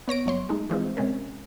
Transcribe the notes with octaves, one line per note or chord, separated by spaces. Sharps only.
B3 C#5 A#6 D7
G1 F#3 C#5 C6
G#3 A3 D#4
E3 F3 G#3 C4
C3 G#3 C#4 A#4